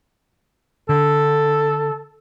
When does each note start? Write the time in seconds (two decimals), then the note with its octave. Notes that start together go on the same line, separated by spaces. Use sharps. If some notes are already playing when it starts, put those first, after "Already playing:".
0.89 D3 A4